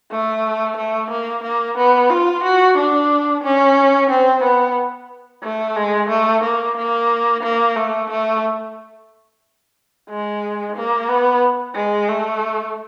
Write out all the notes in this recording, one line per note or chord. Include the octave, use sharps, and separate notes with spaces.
A3
A3
A#3
A#3
B3
F4
F#4
D4
C#4
C4
B3
A3
G#3
A3
A#3
A#3
A#3
A3
A3
G#3
A#3
B3
G#3
A3